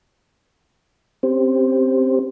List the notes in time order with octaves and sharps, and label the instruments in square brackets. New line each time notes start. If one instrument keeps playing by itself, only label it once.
[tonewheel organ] C4 C#4 G4 C5